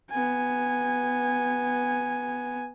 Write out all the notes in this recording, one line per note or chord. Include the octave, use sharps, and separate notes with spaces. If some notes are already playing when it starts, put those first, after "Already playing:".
B3 G#5